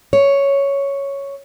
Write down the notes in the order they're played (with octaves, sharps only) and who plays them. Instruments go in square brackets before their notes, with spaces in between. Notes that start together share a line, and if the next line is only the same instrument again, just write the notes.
[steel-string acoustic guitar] C#5